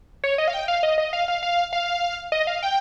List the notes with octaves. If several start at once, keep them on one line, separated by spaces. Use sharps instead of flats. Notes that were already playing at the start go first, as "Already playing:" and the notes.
C#5
D#5
F5
G5
F5
D#5
D#5
F5
F5
F5
F5
D#5
F5
G5